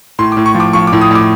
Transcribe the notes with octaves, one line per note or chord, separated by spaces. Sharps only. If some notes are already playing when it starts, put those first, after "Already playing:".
A2 C6
A2 D6
C#6
F3
D6
F3 C#6
D6
A2
D#6
A2 D6